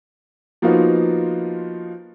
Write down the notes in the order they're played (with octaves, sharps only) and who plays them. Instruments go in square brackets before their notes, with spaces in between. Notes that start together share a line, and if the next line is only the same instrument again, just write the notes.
[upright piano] F3 A#3 B3 D#4 F4 F#4